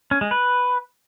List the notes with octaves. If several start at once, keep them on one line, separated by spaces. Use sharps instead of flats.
C#4
G#3
B4